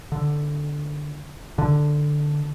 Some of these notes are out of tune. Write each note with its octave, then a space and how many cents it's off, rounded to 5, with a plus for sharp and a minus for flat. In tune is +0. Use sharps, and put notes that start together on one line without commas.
D3 +5
D3 +5